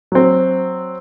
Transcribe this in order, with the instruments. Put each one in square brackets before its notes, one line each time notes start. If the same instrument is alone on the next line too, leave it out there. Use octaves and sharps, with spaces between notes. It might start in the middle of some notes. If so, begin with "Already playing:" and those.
[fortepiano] F#3 C4